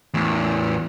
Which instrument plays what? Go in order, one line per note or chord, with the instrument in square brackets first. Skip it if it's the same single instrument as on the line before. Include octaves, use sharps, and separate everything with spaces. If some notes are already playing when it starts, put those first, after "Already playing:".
[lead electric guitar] E2 A2